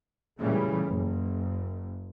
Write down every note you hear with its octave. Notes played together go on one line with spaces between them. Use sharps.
A#2 C#3 E3 G3 A3
F#1